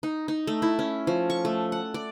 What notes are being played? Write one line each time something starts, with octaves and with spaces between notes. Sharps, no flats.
D#4
D#4
A3
E4
C#4
F3
C#6
A3
F#5
D5